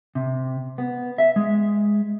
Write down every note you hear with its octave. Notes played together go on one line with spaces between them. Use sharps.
C3
B3
E5
G#3